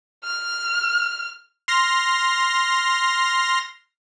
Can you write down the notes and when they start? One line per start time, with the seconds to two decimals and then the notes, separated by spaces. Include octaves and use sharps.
0.25 F6
1.68 C6 F6 A#6